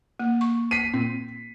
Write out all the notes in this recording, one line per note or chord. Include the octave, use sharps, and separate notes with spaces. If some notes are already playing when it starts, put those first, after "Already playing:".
A#3
C#6
B6 C7 D#7
A#2 C4